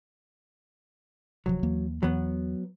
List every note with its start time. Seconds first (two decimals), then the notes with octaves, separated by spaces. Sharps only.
1.46 D1 C3 F3 F#3
1.63 D#2 E3 A#3
2.03 E2 E3 F#3 B3